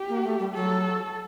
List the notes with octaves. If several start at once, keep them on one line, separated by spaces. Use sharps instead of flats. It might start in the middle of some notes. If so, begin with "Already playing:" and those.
Already playing: G4
A#3
A3
G3
F#3 A4